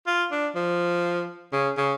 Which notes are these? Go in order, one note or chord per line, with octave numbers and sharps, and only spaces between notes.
F4
D4
F3
C#3
C#3